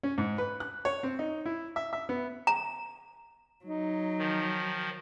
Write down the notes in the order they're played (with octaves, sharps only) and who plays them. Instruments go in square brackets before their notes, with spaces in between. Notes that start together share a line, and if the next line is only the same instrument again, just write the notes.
[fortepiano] C#4
G#2
B4
F#6
C#5
C4
D#4
E4
E5
E5
B3
[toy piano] A#5
[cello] F#3 [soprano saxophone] D#4
[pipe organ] D#3 F3